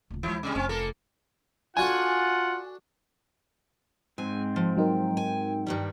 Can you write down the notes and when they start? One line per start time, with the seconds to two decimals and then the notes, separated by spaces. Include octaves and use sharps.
0.10 D1 C#2
0.23 D#2 E3 G#3 E4
0.43 C3 G3
0.55 F1 C4 C#4
0.69 A#3 A4 A#4
1.77 D4 F4 F#4 A4 F#5 G#5
4.18 G#2 C4 G#5
4.56 F3
4.77 F#3 D#4 A#4 G5
5.17 G#5
5.67 G2 D#3 G3